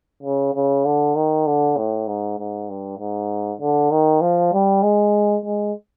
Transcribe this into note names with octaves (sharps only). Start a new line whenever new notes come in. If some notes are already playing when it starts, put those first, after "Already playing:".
C#3
C#3
D3
D#3
D3
A2
G#2
G#2
G2
G#2
D3
D#3
F3
G3
G#3
G#3